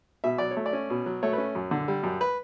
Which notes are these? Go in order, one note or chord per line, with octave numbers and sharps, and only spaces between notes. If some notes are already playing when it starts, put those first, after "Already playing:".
B2 E5
F#3 D5
C#5
A3
D5
C#4
B2
F#3
A3 C#5
B4
C#4
F#2
D3
G3
F#2
B4